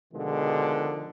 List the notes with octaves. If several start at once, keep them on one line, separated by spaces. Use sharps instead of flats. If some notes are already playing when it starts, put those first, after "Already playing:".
B2 D3 D#3 F3 G#3